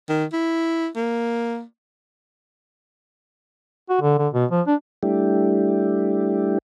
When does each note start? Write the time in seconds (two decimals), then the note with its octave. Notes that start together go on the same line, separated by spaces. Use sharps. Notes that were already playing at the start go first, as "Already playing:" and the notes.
0.09 D#3
0.33 E4
0.96 A#3
3.89 F#4
4.01 D3
4.18 D3
4.33 B2
4.51 F3
4.67 D4
5.03 G3 A3 D4 E4 G4